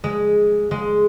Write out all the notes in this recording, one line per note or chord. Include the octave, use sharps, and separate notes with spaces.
G#3
G#3